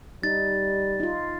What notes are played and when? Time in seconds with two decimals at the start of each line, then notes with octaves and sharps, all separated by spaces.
0.23 G3 D#4 A6
1.00 D#4 F4